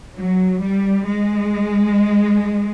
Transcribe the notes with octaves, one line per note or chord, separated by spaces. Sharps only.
F#3
G3
G#3